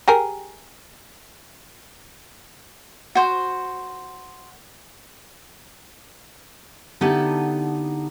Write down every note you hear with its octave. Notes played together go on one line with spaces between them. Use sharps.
G4 G#4 A#4
F#4 C5
D3 B3 D#4 E4 G4 A4